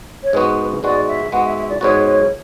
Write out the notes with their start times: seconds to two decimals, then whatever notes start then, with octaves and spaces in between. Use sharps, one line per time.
0.23 C#5
0.33 G#2 G#3 B3 F#4 B4
0.83 G#2 G#3 B3 F#4 D5
1.08 E5
1.32 G#2 G#3 B3 F#4 F#5
1.44 E5
1.57 E5
1.69 D5
1.81 G#2 G#3 B3 F#4 C#5
2.06 C#5